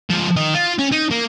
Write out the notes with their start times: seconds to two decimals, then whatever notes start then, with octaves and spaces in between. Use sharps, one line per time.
0.10 F3 G#3
0.36 D#3 D#5
0.54 F4
0.79 C#4
0.92 D#4
1.11 A#3